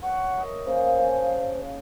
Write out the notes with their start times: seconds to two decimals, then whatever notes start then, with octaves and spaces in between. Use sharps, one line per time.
0.03 C#5 E5 F#5
0.38 A#4 D#5 E5
0.66 C#3 A#3 C5
0.99 F5 G#5 A5